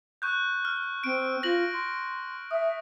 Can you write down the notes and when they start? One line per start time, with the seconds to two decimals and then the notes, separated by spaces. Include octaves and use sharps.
0.22 C#6 F#6 G6
0.65 F6
1.04 C4 D7
1.43 F4 A#6 F#7
1.72 C6
2.51 E5 D#6